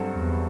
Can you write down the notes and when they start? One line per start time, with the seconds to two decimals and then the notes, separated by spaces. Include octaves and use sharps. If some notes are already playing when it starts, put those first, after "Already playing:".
Already playing: G2 F#3 C4 F#4 A4
0.14 E2